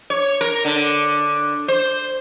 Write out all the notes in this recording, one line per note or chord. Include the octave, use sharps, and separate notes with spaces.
C#5
A#4
D3
C5